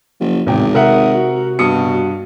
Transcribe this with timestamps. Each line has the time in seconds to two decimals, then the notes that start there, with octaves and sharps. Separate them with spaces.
0.20 F#1 F3
0.47 G#1 E2 A2 C3 G5
0.74 C3 A#4 E5 F#5 D#6
1.14 F#4
1.59 G2 B2 D#6 C#7